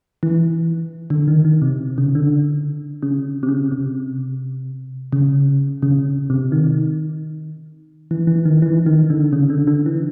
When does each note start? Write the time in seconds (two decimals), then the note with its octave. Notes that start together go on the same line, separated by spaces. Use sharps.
0.23 E3
1.10 D3
1.28 D#3
1.45 D#3
1.62 C3
1.98 C#3
2.15 D3
3.03 C#3
3.43 C3
3.48 C#3
3.72 C3
5.13 C#3
5.83 C#3
6.30 C3
6.52 D#3
8.11 E3
8.27 E3
8.45 D#3
8.62 E3
8.86 D#3
9.10 D3
9.33 C#3
9.50 D3
9.67 D3
9.86 E3